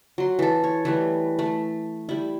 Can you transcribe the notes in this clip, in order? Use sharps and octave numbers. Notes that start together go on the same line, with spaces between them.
F#3 C6
E3 A4
C#5
E3 G3 A3
A3
G3 E4